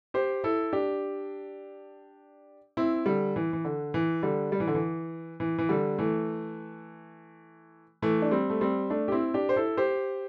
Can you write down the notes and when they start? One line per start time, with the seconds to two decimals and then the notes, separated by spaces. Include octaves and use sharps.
0.14 G4 C5
0.44 E4 A4
0.73 D4 G4
2.77 C4 E4
3.06 D3 G3
3.36 E3
3.53 E3
3.65 D3
3.94 E3
4.23 D3 G3
4.52 G3
4.60 E3
4.67 D3
4.75 E3
5.40 E3
5.58 E3
5.69 D3 G3
5.98 E3 A3
8.02 E3 A3
8.22 D4
8.31 G3 C4
8.50 A3
8.61 G3 C4
8.90 A3 D4
9.08 G4
9.12 C4 E4
9.34 D4 G4
9.49 C5
9.56 E4 A4
9.77 G4 C5